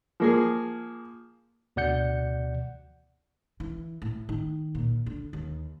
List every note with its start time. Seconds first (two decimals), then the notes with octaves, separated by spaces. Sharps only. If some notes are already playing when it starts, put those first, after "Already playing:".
0.20 F3 A#3 G#4
1.76 D2 B2 D5 F#5 G6 C#7
3.60 E3
4.02 A2
4.29 D#3
4.75 A#2
5.06 D3
5.33 D#2